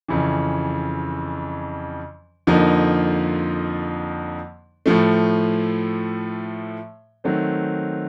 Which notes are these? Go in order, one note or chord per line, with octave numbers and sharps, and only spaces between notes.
F2 C#3 E3
F2 D3 F3 A#3 D#4
A2 F3 A3
D#3 F#3 A3 C4